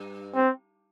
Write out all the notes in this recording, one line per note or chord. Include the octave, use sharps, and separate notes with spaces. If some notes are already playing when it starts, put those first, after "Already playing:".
Already playing: G2
C4